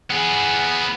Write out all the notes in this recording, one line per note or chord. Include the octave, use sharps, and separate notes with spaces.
B3 G#4